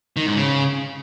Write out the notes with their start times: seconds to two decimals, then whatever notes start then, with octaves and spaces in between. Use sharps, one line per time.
0.16 D#3
0.26 G#2
0.36 C#3